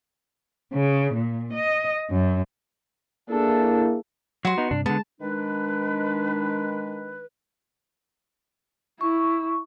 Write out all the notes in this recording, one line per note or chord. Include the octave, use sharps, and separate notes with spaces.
C#3
A#2
D#5
F#2
A#3 D4 E4 G#4 A4
F#3 F#4 C6
B3 D#4
G2 C3 D4
D3 G#3 B3 A5
D#3 G#3 D4 B4
E4 C#6